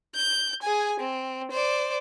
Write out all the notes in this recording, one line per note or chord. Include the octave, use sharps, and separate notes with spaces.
G6
G#4 G#5
C4
C5 D5